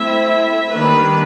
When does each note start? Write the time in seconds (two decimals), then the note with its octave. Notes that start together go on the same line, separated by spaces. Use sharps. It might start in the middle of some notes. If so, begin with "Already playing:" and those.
Already playing: A3 C4 E4 E5
0.73 D#3 G3 A#3 D4 B4